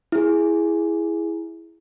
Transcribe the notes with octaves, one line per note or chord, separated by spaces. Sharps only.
E4 G#4